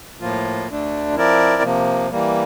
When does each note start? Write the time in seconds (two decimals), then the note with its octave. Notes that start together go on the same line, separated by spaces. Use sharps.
0.20 A2 F3 A#3 F4
0.67 D2 D3 A3 D4
1.15 F3 C4 E4 A#4 D5
1.62 C3 F3 A#3
2.11 E3 G3 A#3